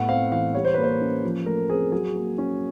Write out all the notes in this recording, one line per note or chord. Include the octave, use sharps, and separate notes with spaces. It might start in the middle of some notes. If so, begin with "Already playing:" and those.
Already playing: A2 A3 B3 F#5
C4 F5
E3 F5
G3 C#5
C5
A#3 B4
C5
C#4
F3
A3 A#4
C4 G#4
F#3 G#4
A#3
C#4